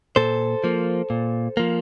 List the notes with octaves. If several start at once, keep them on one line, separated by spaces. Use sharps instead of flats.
A#2 A4 C5
F3 A#3
A#2
F3 A#3